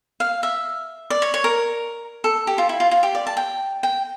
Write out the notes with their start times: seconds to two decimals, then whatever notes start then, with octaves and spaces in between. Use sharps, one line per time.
0.20 F5
0.43 E5
1.10 D5
1.22 C#5
1.34 C#5
1.44 A#4
2.24 A4
2.47 G4
2.58 F4
2.69 E4
2.80 F4
2.91 F4
3.03 G4
3.15 D5
3.27 A5
3.37 G5
3.83 G5